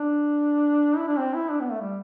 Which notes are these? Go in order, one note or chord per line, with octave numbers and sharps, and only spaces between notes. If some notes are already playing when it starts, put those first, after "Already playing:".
Already playing: D4
E4
D4
C4
E4
D4
B3
A3
G3